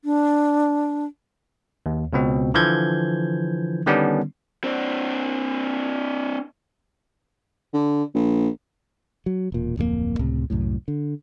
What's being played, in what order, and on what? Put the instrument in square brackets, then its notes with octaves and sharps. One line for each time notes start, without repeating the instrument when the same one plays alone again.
[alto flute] D4
[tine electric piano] D#2
C#2 B2 C4
D3 E3 F3 G6 G#6
D3 D#3 G3 B3 C#4 D4
[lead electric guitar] C4 D4
[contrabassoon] D3
A#1
[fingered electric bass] F#3
E1 A#2
D1 F2 G3 A#3
C#2 A2 C3
C2 F#2 A2
D3